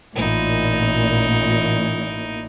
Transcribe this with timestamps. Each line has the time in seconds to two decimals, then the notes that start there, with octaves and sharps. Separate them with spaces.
0.15 A1 A#2 D#4 E4